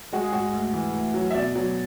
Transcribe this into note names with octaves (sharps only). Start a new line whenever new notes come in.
G#3 F#4
G#4
G#2 F#4
D2
E3
D2
F#3
E5
B2 D5
F#3